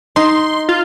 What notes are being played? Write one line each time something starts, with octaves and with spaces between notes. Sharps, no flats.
D#4 C6
F4